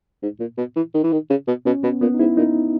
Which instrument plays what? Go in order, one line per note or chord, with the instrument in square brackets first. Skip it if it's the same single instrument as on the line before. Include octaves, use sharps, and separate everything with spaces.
[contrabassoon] G#2
A#2
B2
E3
D#3
E3
D#3
C#3
B2
[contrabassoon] B2 [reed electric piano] C#4
[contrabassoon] B2 [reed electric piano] B3
[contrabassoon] A#2 [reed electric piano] B3
[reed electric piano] D#4
[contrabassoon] G#2 [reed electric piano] E4
[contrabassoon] A#2 [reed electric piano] D#4